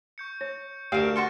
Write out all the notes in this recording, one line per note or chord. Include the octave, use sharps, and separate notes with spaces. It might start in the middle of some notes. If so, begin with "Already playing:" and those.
C#6 G6 C#7
C#5
D2 G4 A#4 F5 D7 E7
F#4 C6 C#6 F6 A6 A#6